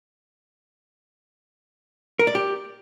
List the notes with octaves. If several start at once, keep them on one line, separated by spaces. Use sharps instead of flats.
A#4
D5
G4